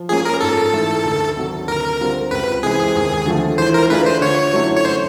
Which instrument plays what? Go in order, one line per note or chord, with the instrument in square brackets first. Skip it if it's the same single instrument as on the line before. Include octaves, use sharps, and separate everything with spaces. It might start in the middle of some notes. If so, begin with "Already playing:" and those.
Already playing: [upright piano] F3
[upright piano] A#3 C#4 F4 [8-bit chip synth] G#4
[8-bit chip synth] A#4
[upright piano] G#2 [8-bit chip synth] A4
[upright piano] E3 A3
D2
C3 D#3 F#3
[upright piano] D2 [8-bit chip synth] A#4
[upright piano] D3 G3 C4 F4
[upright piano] C#2 [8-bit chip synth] B4
[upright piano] C3 E3 G#3 C4 [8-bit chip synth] G#4
[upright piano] D#2
D3 F3 A3
[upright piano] E3 [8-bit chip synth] C5
[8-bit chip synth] A#4
[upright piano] A3 D4 F4 G#4 [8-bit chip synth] B4
[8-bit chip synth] C5
[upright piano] D3 [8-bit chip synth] C#5
[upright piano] F#3 A3 C#4 E4
[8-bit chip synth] C#5
C5